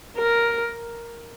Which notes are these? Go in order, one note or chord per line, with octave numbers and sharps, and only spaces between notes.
A#4